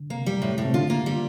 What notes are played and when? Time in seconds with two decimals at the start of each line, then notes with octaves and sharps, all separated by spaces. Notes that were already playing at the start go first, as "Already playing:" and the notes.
Already playing: D3
0.10 C3 A#3
0.26 G3
0.42 A2
0.58 A2
0.65 C3
0.74 D3 F4
0.90 A#3
1.06 G3